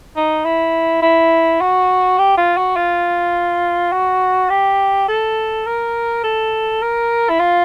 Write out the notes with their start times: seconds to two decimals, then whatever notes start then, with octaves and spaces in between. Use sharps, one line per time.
0.16 D#4
0.45 E4
1.02 E4
1.61 F#4
2.18 G4
2.37 F4
2.57 F#4
2.76 F4
3.92 F#4
4.50 G4
5.08 A4
5.66 A#4
6.24 A4
6.82 A#4
7.29 E4
7.39 F4